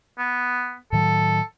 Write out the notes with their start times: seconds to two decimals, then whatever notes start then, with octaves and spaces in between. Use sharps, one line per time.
0.18 B3
0.92 A2 D#3 F#3 A4